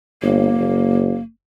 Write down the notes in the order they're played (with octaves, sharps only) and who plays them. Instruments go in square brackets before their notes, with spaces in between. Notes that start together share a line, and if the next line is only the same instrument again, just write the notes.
[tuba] G1 [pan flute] A#3
[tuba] F#1